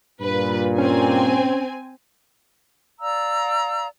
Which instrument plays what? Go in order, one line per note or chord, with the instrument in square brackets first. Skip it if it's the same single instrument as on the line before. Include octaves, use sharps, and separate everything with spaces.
[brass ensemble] G2 A#2 [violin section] B4
[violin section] C4 G#5 [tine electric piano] C#4
[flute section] D5 F5 A#5 E6